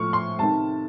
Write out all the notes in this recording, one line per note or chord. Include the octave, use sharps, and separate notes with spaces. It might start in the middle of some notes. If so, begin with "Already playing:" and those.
Already playing: A2 F3 C#6 F6
C6
C3 D#3 A5